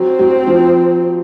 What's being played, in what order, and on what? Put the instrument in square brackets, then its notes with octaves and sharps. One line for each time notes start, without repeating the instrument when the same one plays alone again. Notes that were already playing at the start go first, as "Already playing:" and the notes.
Already playing: [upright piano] F#3 [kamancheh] C4
[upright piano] F#3
F3